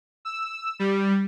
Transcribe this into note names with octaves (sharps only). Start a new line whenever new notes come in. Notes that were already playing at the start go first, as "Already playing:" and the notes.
E6
G3